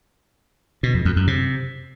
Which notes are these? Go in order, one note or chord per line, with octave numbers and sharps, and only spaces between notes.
B2
F2
F2
F#2
C3